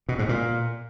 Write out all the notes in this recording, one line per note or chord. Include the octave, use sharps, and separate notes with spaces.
B2
G#2
A#2